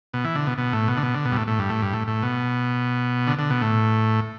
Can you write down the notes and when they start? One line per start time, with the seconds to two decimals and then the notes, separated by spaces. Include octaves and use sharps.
0.13 B2
0.24 E3
0.35 D3
0.47 B2
0.58 B2
0.73 A2
0.88 B2
0.97 D3
1.03 B2
1.14 D3
1.25 B2
1.32 G2
1.37 A2
1.47 A2
1.59 G2
1.70 A2
1.82 G2
1.93 A2
2.07 A2
2.23 B2
3.27 D3
3.39 D3
3.50 B2
3.61 A2